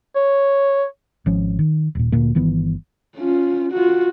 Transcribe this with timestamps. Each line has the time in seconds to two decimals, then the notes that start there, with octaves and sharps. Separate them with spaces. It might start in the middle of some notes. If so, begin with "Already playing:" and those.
0.16 C#5
1.26 G#1 F3 C#4
1.59 D#3
1.95 D#1 A#2
2.12 D2 A#2 A#3
2.35 G1 D#3 E3 B3
3.17 C#4 F4
3.72 F4 F#4